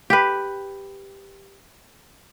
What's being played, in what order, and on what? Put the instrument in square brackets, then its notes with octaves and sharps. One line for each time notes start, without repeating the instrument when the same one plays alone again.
[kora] G4 B4